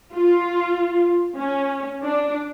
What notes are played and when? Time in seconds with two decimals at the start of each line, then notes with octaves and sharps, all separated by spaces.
0.16 F4
1.37 C#4
2.05 D4